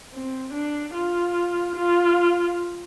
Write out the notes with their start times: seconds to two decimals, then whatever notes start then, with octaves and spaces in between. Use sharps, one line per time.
0.13 C4
0.53 D4
0.94 F4
1.76 F4